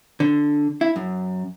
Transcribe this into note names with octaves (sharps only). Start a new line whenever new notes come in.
D3
E4
F#2